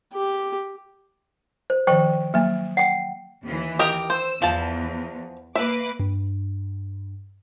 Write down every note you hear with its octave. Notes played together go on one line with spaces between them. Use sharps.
G4
C5
D#3 F3 C5 G5 C#6
F#3 A#3
F#5 G5
D#2 E3
G4 A#4 D#5
C5 E6
E2 F3 A5
A#3 B4 E5 D6
G2